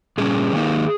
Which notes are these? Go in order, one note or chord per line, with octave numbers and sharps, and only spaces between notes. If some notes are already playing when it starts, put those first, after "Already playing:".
A#2 G3 C#4 G#4
D#3 A#3 D#4